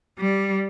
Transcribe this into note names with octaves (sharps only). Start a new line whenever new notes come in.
G3